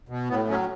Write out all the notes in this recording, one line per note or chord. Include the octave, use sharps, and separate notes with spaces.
B2
A2 B3
F#3 C#4